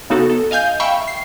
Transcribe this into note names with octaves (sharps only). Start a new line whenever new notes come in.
C#3 B3 D#4 F#4 A4
A4
D#5 F5 G#5 G6
E5 F5 G5 B5 C#6
C7